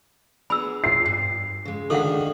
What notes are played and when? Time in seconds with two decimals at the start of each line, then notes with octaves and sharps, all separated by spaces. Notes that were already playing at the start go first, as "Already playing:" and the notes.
0.50 B3 D4 G#4 B5 E6
0.84 C7
1.06 G2
1.65 C#3 G#3
1.90 D2 D#3 A4 F5 F#5